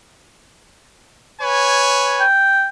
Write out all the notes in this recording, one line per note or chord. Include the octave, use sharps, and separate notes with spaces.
B4 C#5 G#5
G5